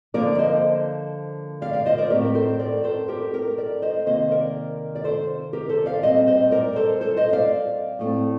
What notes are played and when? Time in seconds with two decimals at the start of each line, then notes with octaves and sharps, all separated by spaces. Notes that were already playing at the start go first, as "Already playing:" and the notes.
0.14 D3 F3 A#3 A#4 D5
0.38 C5 D#5
1.62 D5 F5
1.73 D5 F5
1.85 C5 D#5
1.98 A#4 D5
2.10 A2 A3 C4 G4 A#4
2.25 A#4
2.35 A4 C5
2.59 A#4 D5
2.83 A4 C5
3.08 G4 A#4
3.33 G4 A#4
3.58 A#4 D5
3.82 C5 D#5
4.06 C3 D#3 A#3 C5 D#5
4.31 A#4 D5
4.95 D5
5.04 A4 C5
5.53 G4 A#4
5.69 A4 C5
5.86 D5 F5
6.03 A#2 G3 C4 C5 D#5
6.27 C5 D#5
6.51 A#4 D5
6.76 A4 C5
7.01 A4 C5
7.17 C5 D#5
7.33 D5 F5
7.99 A2 A3 C4